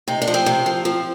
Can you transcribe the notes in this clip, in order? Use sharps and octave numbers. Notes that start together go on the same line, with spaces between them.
C3 D#4
D4
F3
C4
C3
F3
F3